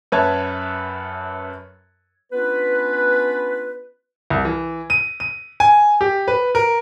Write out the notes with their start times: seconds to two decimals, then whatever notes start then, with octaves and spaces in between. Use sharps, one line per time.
0.12 F#2 B4 C#5 E5 A5 G#6
2.33 B3 C#4 D4 F4 B4
4.30 C2
4.45 E3
4.90 D#7
5.20 D#7
5.60 G#5
6.01 G4
6.28 B4
6.55 A#4